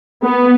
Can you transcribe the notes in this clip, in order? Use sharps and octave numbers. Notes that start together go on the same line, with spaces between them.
B3